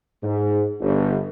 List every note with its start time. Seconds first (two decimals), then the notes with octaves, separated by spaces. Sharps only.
0.23 G#2
0.81 G1